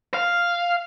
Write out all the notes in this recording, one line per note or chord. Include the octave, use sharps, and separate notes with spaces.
F5